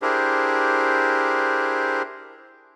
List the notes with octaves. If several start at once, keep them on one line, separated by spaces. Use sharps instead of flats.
D4 E4 G4 G#4 A#4 C5